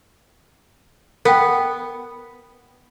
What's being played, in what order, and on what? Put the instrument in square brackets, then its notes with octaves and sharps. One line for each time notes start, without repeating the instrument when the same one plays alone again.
[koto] B3 [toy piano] A#4 G5